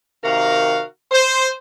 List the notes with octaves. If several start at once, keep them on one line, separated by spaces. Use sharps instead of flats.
C3 D#3 F#4 A#4 F5
C5